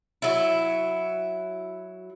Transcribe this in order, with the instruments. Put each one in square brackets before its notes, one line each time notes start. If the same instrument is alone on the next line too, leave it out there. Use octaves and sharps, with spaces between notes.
[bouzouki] F#3 E4